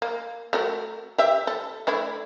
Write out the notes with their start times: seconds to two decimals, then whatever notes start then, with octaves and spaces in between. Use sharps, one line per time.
0.02 A#3
0.53 A3 F#4 A#4
1.18 G4 E5
1.47 A4
1.87 A3 D4 E4